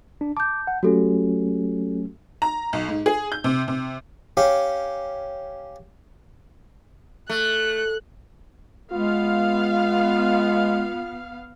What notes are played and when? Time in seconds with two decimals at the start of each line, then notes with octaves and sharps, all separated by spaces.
0.21 D4
0.37 A5 D6 G6
0.67 F#5
0.83 F#3 A3 C#4 F#4 G4 A4
2.42 A#5
2.73 B1
2.88 G#2
3.06 G#4
3.32 G6
3.44 C3
3.68 C3
4.37 C#4 G4 F5
7.30 A3 F#6
8.92 G#3 B3 F4 F5